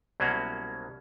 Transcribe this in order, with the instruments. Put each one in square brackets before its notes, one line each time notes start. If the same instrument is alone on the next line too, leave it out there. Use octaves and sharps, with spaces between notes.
[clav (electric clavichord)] C2 B2 F#3 A#3 C#4 F#4